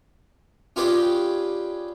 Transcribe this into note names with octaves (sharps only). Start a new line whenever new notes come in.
C#4 F4 G4 G#4 B4 D5